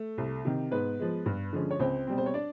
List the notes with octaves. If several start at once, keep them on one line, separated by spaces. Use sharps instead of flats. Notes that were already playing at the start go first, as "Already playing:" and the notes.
Already playing: A3
C2
C3 D#3
G#2 B3 B4
F3 G#3
G2
D3 F3 G#3 C#4
C#5
C#2 C4 C5
B2 G3 C4
C5
C#5
D4 D5